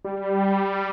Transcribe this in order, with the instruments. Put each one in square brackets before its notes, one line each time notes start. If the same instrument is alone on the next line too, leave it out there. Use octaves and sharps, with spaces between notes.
[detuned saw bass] G3